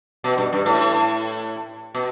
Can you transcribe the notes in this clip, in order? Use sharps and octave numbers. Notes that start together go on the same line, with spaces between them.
B2
G2
G2
A2
B2